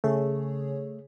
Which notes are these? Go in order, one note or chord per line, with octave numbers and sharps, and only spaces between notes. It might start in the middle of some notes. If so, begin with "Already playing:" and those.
C#3 A3 G#4 C#5